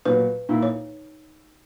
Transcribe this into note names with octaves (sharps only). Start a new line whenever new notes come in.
A#2 F#3 B3 B4
A#2 A#3 D#4 E4
C#5